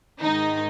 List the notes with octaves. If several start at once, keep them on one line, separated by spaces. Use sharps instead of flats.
G#2 D#3 D#4